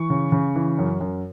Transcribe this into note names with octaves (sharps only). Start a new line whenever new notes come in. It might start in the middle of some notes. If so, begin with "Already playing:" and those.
Already playing: E3 C#6
C#3
C#3
E3
F#2
F#2